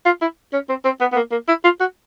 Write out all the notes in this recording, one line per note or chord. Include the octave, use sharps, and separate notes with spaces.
F4
E4
C#4
C4
C4
B3
B3
A#3
A#3
E4
F4
F#4